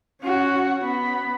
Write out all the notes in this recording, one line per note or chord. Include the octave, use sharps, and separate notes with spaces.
C#4 F#4
B3 B5